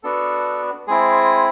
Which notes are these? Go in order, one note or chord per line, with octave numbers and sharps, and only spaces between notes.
B3 D4 F#4 A4
G#3 C4 E4 G#4